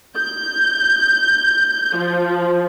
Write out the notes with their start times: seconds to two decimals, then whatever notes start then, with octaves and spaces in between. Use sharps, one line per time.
0.17 G6
1.97 F3